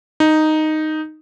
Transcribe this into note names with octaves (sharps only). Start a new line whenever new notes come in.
D#4